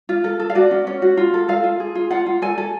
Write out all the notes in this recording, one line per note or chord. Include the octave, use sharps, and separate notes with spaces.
F4
A4
A4
F5
F#4 D5
C#4
C#4 C#5
F#4
F4
A4
A4 F5
F4
G#4
F4
F4 F#5
F4
A4 G#5
A4